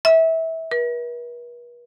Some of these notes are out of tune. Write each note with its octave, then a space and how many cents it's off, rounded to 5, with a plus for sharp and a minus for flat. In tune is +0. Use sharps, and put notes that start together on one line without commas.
E5 -25
B4 -45